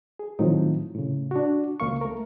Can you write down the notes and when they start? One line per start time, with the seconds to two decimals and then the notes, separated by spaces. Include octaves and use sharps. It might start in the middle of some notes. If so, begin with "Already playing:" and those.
0.19 G#4
0.39 A2 D#3 F3 F#3 C4 D#4
0.94 A2 C#3
1.31 D4 F#4
1.80 C#2 A#3 F5 C#6
2.01 A3 A#4